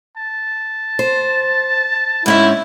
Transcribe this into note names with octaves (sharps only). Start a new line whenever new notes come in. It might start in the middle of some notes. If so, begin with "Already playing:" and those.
A5
C5
G#2 C4 C#4 E4 E5